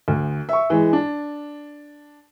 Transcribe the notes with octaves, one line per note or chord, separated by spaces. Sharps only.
D2
E5 C#6
E3 G#3
D4